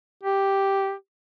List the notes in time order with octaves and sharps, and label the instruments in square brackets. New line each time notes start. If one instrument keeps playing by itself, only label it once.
[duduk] G4